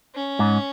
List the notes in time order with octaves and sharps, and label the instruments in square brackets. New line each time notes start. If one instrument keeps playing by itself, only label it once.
[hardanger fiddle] C#4
[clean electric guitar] G#2